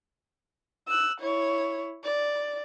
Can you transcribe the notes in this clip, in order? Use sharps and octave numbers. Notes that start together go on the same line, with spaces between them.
E6 F#6
E4 C#5
D5